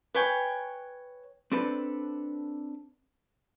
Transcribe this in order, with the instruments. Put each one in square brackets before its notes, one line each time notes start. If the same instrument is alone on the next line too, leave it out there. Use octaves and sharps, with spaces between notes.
[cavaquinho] B4 C#5 G5 G#5
[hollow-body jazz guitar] C4 D4 A4 B4